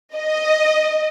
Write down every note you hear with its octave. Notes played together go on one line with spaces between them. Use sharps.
D#5